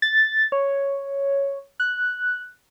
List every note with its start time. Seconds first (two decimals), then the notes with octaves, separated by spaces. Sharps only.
0.02 A6
0.52 C#5
1.80 F#6